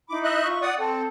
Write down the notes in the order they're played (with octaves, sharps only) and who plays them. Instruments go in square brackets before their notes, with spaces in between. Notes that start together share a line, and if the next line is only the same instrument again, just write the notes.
[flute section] D#4 E4 B5 [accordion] D6
[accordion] D#5 E5 F#6
[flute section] F4 C#6
[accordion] D5 F#5 D#6
[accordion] C4 [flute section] A4